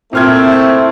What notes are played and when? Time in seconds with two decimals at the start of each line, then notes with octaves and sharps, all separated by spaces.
0.13 A#2 A3 C4 E4 F6 G#6